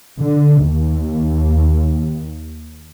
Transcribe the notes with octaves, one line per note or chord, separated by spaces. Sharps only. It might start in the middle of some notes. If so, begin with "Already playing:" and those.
D3
D#2